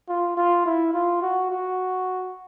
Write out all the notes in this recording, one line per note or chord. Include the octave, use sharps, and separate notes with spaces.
F4
F4
E4
F4
F#4
F#4